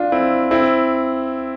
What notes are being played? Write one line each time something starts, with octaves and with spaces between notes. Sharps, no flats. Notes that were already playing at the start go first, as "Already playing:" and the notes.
Already playing: D4 F4
C4 E4
C4 E4